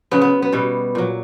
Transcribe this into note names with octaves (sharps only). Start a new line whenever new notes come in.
C#3 F#3 B3
B3
B3
B2 G3
A#2 F#3